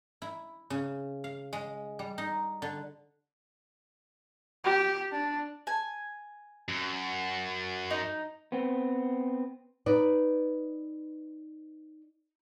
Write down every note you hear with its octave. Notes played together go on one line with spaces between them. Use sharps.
E4
C#3
F5
G#3
G3
D#4
D3
G4
D4
G#5
F#2
D#4
B3 C4
D#4 B4 D5